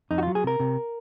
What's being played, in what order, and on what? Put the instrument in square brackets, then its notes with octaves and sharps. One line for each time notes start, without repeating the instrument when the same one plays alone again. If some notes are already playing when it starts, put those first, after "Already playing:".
[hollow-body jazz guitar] F2 D#4
F#4
F#3 F4
G#4
C3 A#4
C3